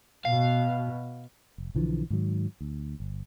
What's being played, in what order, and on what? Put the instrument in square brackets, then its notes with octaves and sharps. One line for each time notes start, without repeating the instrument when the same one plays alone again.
[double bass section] B2 [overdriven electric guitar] F5
[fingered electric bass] F1
B1 D3 E3 F3
G#2 D#3 F#3
D2
G1